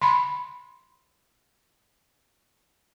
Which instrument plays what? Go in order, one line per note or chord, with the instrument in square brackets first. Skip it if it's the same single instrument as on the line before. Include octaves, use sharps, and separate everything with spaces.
[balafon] B5 C6